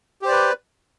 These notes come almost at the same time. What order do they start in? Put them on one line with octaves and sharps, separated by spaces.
G4 C5 D5 B4